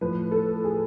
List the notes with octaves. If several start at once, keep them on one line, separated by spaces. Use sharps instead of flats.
A2 F3 B4
A4
G#4